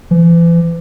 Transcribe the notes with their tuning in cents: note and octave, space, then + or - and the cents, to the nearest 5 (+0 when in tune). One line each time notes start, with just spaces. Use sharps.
E3 +40